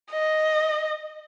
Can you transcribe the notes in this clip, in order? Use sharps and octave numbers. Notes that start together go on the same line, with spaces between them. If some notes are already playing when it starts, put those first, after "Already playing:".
D#5